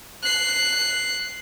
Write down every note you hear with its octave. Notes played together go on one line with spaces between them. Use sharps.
F#6 C7